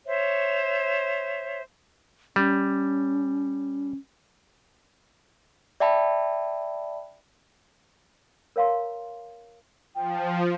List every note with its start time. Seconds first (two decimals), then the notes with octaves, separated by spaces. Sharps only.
0.06 C5 C#5 E5
2.36 G3 C#4
5.80 D5 E5 G5 A5 B5
8.56 A#4 C#5 F5 A#5 C6
9.95 F3 G5